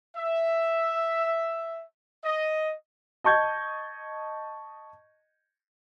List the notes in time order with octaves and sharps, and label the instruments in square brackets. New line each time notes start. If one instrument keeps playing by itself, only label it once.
[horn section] E5
D#5
[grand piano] D#5 A5 C#6 G6 G#6